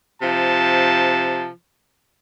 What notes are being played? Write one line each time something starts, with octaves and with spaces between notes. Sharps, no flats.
C3 F3 A5